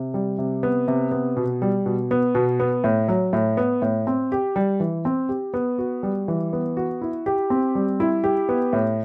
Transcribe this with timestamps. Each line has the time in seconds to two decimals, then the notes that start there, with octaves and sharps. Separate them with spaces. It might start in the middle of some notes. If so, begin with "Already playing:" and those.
Already playing: C3
0.14 G3
0.38 C3
0.63 B3
0.88 C3
1.11 B3
1.37 B2
1.62 G3
1.86 B2
2.11 B3
2.35 B2
2.60 B3
2.84 A2
3.08 F#3
3.33 A2
3.57 B3
3.82 A2
4.07 C4
4.32 G4
4.56 G3
4.80 E3
5.05 C4
5.29 G4
5.54 B3
5.78 F#4
6.03 G3
6.28 E3
6.53 B3
6.77 F#4
7.01 E4
7.26 G4
7.50 C4
7.75 G3
8.00 E4
8.24 G4
8.49 B3
8.73 A2